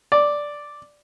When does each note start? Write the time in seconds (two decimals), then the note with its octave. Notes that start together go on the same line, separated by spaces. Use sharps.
0.12 D5